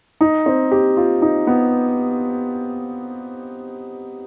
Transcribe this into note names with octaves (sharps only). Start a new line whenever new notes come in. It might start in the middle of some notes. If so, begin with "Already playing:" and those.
D#4
C4
G4
F4
D#4
B3